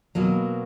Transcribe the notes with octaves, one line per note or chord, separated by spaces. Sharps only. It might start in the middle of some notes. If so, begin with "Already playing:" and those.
B2 F#3 A#3